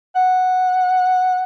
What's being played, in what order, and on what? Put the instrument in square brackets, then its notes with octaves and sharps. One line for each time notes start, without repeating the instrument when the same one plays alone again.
[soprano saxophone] F#5